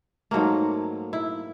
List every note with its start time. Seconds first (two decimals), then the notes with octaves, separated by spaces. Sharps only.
0.31 G#2 F#3 A3 A#3
1.13 E4